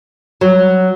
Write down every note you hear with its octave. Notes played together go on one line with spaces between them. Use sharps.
F#3